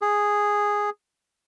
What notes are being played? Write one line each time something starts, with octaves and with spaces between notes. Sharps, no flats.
G#4